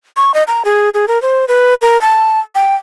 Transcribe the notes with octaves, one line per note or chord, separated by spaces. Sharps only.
C#6
D#5
A#5
G#4
G#4
A#4
C5
B4
A#4
A5
G5